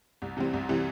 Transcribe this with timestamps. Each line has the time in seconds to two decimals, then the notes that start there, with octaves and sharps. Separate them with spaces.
0.22 C2
0.37 C3 E3 G3 C4
0.53 C2
0.69 C3 E3 G3 C4